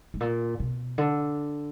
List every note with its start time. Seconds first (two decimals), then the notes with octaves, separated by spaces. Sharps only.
0.14 G#2
0.21 A#2
0.60 B2
0.98 D3